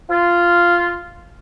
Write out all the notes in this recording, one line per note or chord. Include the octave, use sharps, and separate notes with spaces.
F4